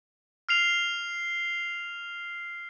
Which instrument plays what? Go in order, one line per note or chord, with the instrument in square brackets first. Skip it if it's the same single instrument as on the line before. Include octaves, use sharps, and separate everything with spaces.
[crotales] F6 C7 F7